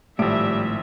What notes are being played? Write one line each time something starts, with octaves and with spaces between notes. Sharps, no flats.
G#1 A2 F3 G3 E5 D7